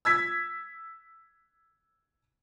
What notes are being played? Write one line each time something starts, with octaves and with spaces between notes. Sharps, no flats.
E6 G#6 B6